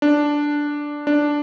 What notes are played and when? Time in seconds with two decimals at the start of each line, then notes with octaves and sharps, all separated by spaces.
0.02 D4
1.07 D4